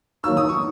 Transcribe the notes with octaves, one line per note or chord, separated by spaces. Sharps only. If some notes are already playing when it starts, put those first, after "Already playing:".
D#3 F#3 A#3 D#4 F#4 E6
D#6
C#6